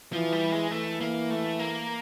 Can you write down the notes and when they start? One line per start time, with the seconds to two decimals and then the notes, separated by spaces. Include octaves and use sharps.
0.13 E3 F3
0.32 G3
0.52 G#3
0.71 E3 A3
1.01 A#3
1.30 A3
1.59 A#3